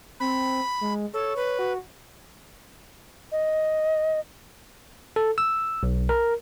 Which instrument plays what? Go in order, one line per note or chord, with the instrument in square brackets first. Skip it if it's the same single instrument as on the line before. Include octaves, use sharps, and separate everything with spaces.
[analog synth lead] C4 [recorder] B5
[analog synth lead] G#3
[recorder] A4 [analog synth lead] C#5
[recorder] B4
[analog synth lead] F#4
[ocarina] D#5
[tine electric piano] A4
E6
B1
A#4